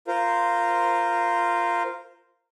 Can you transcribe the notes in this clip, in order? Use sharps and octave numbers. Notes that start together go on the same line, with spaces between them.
F4 A#4 C5